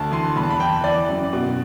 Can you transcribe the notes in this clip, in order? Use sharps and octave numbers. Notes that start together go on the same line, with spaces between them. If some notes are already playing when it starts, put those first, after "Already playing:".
Already playing: D2 A5
E3 C6
E2 B5
A5
B5
E3 G5
E3 D5
F#2
B2